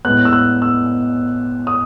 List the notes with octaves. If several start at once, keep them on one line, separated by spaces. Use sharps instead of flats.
A2 G#3 B3 F#6
E6
F#6
E6
D#6